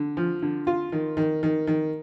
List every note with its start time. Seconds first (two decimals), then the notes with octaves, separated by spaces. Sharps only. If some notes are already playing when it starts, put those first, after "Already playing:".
Already playing: D3
0.17 F3
0.42 D3
0.67 F4
0.92 D#3
1.17 D#3
1.43 D#3
1.67 D#3